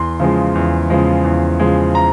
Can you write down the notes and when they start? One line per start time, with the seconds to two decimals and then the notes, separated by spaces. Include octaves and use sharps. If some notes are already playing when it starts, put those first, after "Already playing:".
Already playing: E2 C6
0.20 C#3 F3 G#3
0.55 E2
0.90 C#3 F3 G#3
1.24 E2
1.60 C#3 F3 G#3
1.95 A#5